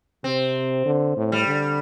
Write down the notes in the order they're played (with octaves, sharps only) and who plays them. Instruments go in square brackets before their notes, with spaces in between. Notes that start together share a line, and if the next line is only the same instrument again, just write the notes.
[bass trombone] C3 [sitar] C4
[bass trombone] D3
A2
[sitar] G3
[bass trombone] D3